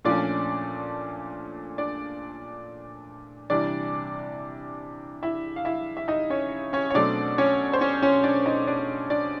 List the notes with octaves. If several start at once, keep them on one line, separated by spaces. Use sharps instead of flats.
A#2 F3 A3 C#4 D4 D5
D4 D5
C3 E3 G3 D4 D5
E4 E5
F5
E4 E5
E5
D#4 D#5
C#4 C#5
C#4 C#5
C#5
B2 F#3 A3 C4 D4 D5
C#4 C#5
C5
C#4 C#5
C#4 C#5
D4 D5
D#4 D#5
D4 D5
D4 D5